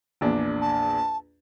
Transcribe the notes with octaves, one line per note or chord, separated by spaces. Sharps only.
A#1 E2 D4
A5